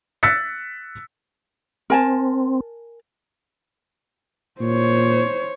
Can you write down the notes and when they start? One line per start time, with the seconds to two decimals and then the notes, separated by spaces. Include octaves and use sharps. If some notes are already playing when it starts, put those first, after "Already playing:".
0.23 E6 F#6 A6 B6 C#7
1.90 C4 A#4 G#5 A5
4.61 A#2 C5 C#5